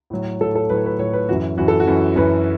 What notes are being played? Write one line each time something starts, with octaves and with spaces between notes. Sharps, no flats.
A2 F#3
A2 F#3 A4
A4
A2 F#3 B4
C#5
B4
A2 F#3 C#5
B4
F#2 E3 F#4
F#2 E3 F#4
A4
F#4
F#2 E3
F#2 E3 B4